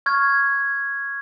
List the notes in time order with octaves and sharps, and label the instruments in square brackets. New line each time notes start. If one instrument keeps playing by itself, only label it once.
[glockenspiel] C#6 F6 G#6